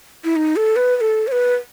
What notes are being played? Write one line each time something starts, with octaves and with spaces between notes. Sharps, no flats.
E4
D#4
A4
B4
B4
A4
C#5
B4